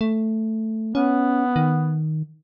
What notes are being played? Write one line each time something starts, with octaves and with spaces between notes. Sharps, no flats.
A3
B3 C#4
D#3